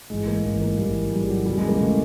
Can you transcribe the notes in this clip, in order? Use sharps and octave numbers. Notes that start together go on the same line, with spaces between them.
A1 G#2 E3 G#3
A#3
A1 G#2 E3
A#3
A1 G#2 E3 G3
A1 G#2 E3 G3
G3
F#3
E2 C#3 E3 G3
G#3
A#3
C#3 E3 A3